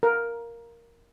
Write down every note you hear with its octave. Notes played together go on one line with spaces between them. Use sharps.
A#4